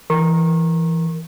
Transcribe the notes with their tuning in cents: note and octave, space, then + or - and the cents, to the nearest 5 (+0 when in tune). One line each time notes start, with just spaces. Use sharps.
E3 +10 A#4 +0 C#6 -35